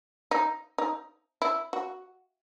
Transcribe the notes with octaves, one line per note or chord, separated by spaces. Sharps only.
D#4
D#4
E4
F#4